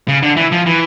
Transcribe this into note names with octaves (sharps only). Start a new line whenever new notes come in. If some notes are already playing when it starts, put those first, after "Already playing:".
C#3
D3
E3
F3
E3